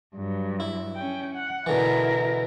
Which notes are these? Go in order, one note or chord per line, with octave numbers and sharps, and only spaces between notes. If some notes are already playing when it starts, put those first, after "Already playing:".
G2 F#3
E4
C#4 G5
F#5
B2 D3 E3 E4 A#4